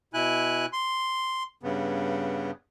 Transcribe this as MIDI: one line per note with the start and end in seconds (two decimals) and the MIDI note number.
0.14 0.66 47
0.14 0.66 64
0.14 0.66 80
0.14 0.66 90
0.73 1.43 84
1.63 2.51 43
1.63 2.51 49
1.63 2.51 59